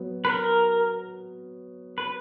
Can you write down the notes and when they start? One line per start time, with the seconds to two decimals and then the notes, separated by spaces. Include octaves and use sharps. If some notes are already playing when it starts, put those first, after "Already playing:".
Already playing: F#3 B3
0.25 B4
0.30 A#4
1.98 B4